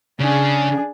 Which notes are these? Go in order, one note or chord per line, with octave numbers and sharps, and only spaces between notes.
C#3 D4 G#4